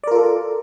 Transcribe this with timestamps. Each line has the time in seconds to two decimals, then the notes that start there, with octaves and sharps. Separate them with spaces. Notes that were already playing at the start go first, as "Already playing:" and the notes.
0.04 D5
0.07 A#4
0.11 F4
0.15 A4